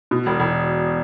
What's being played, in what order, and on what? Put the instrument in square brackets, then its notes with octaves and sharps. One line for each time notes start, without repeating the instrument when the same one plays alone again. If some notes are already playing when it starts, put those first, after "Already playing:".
[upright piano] B2
E1
E1